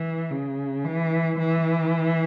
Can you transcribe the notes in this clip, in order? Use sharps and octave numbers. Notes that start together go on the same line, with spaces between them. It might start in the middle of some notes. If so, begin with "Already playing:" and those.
Already playing: E3
C#3
E3
E3